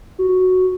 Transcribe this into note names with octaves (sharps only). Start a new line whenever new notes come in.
F#4